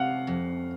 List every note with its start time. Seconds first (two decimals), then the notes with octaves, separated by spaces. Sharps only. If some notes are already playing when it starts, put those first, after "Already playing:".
Already playing: C3 F5 F#5
0.27 F2